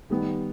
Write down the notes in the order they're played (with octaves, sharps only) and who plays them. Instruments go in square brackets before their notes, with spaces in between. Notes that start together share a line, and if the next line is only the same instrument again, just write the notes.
[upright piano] D#3 G3 B3